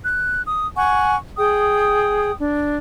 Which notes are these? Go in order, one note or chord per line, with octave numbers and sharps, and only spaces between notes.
F#6
D#6
F#5 G#5 C#6
G#4 G5 D#6
D4